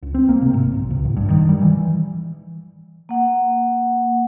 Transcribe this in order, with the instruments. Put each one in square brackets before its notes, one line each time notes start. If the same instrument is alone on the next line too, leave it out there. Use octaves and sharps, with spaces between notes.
[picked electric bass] C#2
C4
A#3
C3
G#1
B1
C#2
A1
G2
D#3
G3
E3
[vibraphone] A#3 F#5